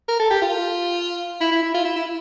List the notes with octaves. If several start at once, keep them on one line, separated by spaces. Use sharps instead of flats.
A#4
A4
G4
F4
E4
E4
E4
F4
E4
E4